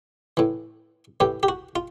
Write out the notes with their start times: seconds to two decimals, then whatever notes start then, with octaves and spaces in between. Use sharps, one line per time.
0.37 A2 E3
1.20 A2 E3 G4
1.43 G4
1.48 F#4
1.76 F4